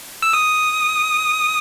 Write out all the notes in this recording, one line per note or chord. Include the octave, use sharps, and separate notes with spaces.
E6
D#6